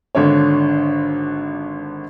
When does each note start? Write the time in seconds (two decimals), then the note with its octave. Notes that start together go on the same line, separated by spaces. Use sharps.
0.15 G#1 D3 D4 C#5